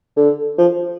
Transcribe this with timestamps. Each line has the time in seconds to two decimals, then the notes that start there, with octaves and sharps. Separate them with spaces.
0.17 D3
0.58 F3